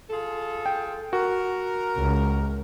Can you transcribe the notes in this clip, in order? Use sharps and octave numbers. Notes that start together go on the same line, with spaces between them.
F4 G#4 A4
G5
F#4 A#4
C#2